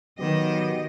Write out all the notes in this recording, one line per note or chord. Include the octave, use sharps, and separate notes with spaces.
D#3 F#3 B3 G4 D#5